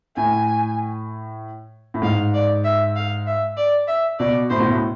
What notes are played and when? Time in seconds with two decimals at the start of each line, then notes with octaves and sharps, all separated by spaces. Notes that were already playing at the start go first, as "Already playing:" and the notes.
0.16 A2 G#5
1.94 A2
2.02 G#2 F5
2.34 D5
2.64 E5
2.96 F5
3.27 E5
3.57 D5
3.88 E5
4.19 B2 D5
4.50 A2 C5
4.60 B2
4.70 A2